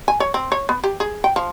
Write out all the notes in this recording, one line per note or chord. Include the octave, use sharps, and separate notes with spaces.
G#5
C#5
C4
C#5
B3
G4
G#4
G5
F3